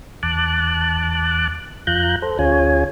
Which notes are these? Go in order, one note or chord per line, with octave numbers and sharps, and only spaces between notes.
E2 A5 D6 F#6
F2 F4 A#5 F#6 G6
A4 C5
D2 C#4 F4 G#4 C#5 G#5